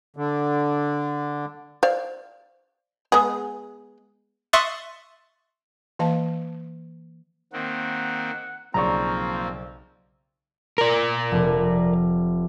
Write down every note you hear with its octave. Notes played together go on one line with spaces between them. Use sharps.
D3
C5 D5 F5
G#3 B3 G#4
E5 C6 C#6 D#6 F#6 A6
E3 A#3 D#5 F5 A5
D#3 A#3 C4 F#5
B1 C#3 F3 A#3 C4 D5 A#5 C#6
A#4 D5
F1